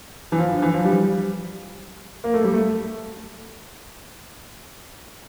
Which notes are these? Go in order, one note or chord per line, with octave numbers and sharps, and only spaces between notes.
E3
F3
D3
E3
F3
G3
A#3
A3
G3
A3